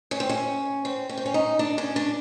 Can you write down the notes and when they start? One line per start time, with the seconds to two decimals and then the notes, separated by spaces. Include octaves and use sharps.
0.11 C#4
0.20 C4
0.29 C#4
0.85 C4
1.09 C#4
1.18 C4
1.26 C#4
1.34 D#4
1.59 D4
1.78 C#4
1.96 D4